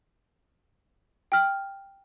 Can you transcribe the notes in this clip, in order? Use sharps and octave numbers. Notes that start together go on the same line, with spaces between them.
G5 F6